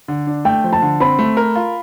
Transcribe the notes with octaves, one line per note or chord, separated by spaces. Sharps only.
D3
D4
A3 G5
F3
A5
D3
C4 B5
A3
A#4
F4